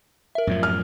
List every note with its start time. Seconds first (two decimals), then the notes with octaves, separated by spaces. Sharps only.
0.35 A#4 E5
0.47 F#2 A2 F3
0.63 F6